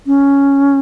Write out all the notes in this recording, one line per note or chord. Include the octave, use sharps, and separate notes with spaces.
C#4